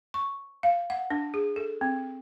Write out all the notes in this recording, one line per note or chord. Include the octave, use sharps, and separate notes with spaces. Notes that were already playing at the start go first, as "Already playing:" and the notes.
C#6
F5
F#5
D4
G#4
A4
C4